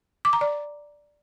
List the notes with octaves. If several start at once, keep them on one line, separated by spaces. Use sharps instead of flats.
D6
A#5
D5